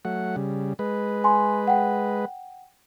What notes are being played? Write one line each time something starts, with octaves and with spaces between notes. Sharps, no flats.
F#3 A3 F#5
C#3 G3
G#3 B4
G#5 C6
F#5 G5